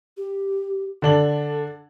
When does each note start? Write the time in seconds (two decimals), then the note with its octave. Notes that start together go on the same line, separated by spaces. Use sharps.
0.17 G4
1.02 D3 D4 A4 F#7